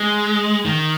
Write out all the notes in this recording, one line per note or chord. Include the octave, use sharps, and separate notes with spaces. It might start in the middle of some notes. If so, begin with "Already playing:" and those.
Already playing: G#3
D#3